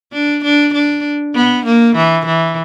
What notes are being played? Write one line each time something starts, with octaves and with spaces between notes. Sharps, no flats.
D4
D4
D4
B3
A#3
E3
E3